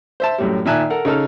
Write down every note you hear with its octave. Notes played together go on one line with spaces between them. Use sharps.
C5 E5 A5
F#2 A2 G3
A#2 D#3 E5 G#5 A5 F#6
A4 A#4 F#5
C#3 D#4 A4 F6